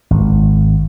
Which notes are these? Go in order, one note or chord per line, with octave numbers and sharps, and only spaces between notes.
G#1